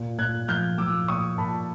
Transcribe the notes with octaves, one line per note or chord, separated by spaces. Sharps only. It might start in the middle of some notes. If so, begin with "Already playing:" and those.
Already playing: A#2
A#2 F#6 G#6
F3 F6 G6
F3 D6 E6
A#2 C#6 D#6
A#2 A5 B5